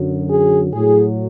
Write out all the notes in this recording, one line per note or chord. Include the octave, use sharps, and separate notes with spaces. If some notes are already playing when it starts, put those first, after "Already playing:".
Already playing: F#2 D3 F#3
G#4
A2 F#3 G#4